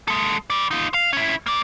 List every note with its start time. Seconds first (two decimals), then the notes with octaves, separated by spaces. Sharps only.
0.08 G#3 A4
0.50 B4 D5
0.71 D#4 F4
0.94 F5
1.13 C#4 E4
1.47 A#3 D5